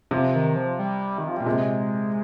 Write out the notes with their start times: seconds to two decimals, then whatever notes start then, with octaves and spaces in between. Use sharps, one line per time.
0.11 C3 F3
0.34 D#3
0.56 F3
0.79 G3
1.18 D#3
1.28 F3
1.37 A#2 G3
1.46 C3 G#3